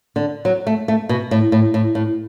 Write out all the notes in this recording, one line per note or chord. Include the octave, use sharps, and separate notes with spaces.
D3
F#3
A3
A3
B2
A2
A2
A2
A2